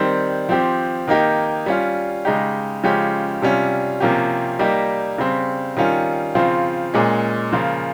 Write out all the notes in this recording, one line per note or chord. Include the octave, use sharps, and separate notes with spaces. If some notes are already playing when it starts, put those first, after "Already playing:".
Already playing: D#3 G3 C4
F3 C4 G4
D#3 A#3 D#4 G4
G3 C#4 F4
C#3 G#3 D#4 G4
C#3 F3 G#3 C#4 G4
C3 G3 C#4 F4
C3 F3 A#3 C#4 G4
G3 A#3 D#4 G4
C#3 G3 C4
D#3 G3 C#4 F4
C#3 F3 C4 F4
A#2 G#3 C#4
C#3 F3 A#3 F4